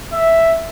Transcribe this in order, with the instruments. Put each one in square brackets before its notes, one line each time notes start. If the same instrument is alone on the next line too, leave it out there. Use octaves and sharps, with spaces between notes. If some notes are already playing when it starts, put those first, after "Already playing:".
[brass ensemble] E5